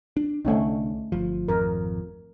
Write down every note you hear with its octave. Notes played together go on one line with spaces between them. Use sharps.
D4
C2 D3 A3 C#4 D#4
G1 F3
G#1 F2 A#4